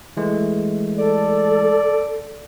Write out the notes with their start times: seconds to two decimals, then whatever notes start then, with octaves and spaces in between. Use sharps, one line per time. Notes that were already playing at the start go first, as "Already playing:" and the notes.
0.17 E3 G#3 A3
0.98 A4 D5